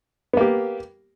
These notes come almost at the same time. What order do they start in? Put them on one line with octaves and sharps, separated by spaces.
B3 A#3 G4